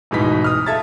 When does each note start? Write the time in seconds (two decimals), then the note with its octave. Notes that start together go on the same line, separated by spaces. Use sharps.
0.11 D1 G#2 B2 E3 D#4 B6
0.44 D#6 F6
0.66 F4 A4 E5 G#6 A6